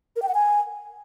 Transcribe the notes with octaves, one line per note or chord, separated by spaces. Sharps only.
A#4
G5
F#5
G#5